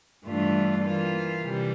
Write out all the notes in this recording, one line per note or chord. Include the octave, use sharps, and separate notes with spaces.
G2 E3 A3 D4 F4
E3 A#3 F4
C3 E3 G3